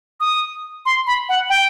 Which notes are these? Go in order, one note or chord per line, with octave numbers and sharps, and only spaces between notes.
D#6
C6
B5
F#5
G5